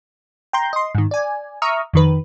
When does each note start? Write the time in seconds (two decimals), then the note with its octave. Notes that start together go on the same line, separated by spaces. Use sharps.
0.53 G5 A#5 C6 G6
0.73 D#5 C6
0.95 G#2 D#3
1.11 D5 G#5
1.62 E5 A#5 C#6 D#6 F6
1.93 F2 D#3 B4